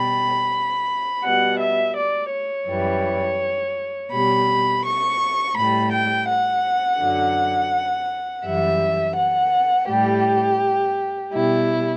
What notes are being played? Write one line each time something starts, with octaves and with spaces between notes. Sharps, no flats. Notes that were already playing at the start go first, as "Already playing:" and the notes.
Already playing: B2 G3 B5
B2 G3 F#5
E5
D5
C#5
F#2 E3 G3
B2 G3 B5
C#6
A2 G3 B5
G5
F#5
F#2 D3 F#3
F#2 E3 G3 E5
F#5
A2 G3 G4
B2 G3 E4